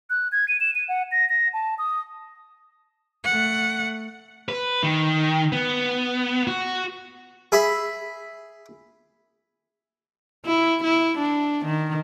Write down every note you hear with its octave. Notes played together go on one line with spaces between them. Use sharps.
F#6
G#6
D#7
E7
D#7
F#5
A#6
A#6
A5
D#6
A3 F#5
B4
D#3
B3
F#4
G#4 E5 B5
E4
E4
D4
D#3